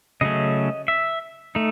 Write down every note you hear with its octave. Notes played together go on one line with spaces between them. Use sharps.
C#3 F#3 A3 C#4 D#5
E5
A3 D#4